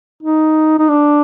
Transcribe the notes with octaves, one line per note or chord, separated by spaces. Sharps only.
D#4
D#4
D4